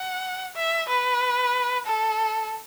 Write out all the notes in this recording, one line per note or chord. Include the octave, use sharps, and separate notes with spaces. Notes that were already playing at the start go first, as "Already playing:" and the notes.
Already playing: F#5
E5
B4
A4